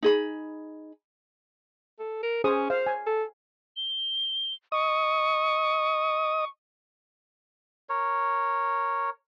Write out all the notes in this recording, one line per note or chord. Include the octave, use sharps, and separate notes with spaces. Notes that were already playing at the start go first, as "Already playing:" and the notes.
D#4 G#4 B5
A4
A#4
C#4 G#4 C5 D#6
C5 F5
G#5
A4
G7
D#5 C#6 D#6
A#4 C#5